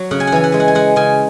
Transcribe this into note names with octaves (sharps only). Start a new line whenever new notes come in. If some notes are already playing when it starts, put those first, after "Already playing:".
Already playing: F#3 C#5
C#3 F#5
G#5
F#5
E3 G#5
F#5
G#3 G#5
F#5
G#5
G#3 F#5
C#3 G#5